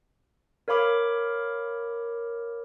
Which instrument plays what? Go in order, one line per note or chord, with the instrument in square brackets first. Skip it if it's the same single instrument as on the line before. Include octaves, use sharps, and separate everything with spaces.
[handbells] A#4 C#5 F5 B5 D6 F6